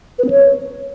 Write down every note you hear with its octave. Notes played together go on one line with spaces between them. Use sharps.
B4
C4
C#5